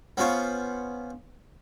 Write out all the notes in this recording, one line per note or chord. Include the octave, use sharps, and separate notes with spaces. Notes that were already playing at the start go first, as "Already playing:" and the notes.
B3 C#4 F4 C5 C#5